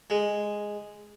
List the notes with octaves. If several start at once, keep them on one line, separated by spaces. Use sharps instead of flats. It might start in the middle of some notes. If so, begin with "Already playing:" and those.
G#3